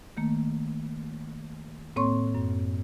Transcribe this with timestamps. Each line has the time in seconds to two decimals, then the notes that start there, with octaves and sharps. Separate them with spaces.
0.17 D#3 A3 A#3
1.96 A2 A#3 C4 C#5 C6 C#6
2.35 F#2